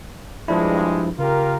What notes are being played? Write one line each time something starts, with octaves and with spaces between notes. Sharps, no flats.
G2 F3 G#3 D4 E4
C#3 F4 G4 A#4